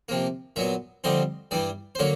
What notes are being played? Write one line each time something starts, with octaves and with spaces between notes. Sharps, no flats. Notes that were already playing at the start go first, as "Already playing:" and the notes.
C3 F3 A#3
A#2 F#3 B3 E5
F2 D3 G3 C4 D#5
G2 E3 G3 D5
C5
D3 F#3 A#3 C#5